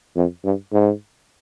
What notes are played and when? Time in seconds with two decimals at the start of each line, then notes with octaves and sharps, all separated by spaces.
0.16 F2
0.44 G2
0.73 G#2